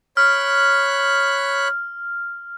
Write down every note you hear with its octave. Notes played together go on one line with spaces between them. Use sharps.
C#5 B5 F6 F#6